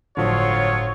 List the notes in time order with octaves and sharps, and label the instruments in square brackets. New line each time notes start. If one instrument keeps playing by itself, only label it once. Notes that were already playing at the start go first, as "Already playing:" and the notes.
[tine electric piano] G1 A2 [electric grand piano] D3 F3 [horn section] F#3 F4 [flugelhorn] C#5